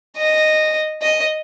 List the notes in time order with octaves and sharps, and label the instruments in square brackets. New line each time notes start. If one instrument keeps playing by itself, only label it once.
[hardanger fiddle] D#5
D#5